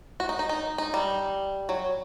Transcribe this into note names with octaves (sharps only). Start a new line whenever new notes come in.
F#4
D#4
D#4
D#4
D#4
G3
F#3